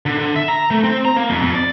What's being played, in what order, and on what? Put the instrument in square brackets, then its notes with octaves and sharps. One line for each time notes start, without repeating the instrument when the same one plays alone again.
[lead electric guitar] D3
D3
E5
A#5
A3
C4
A#5
A#3
F2
F2
D5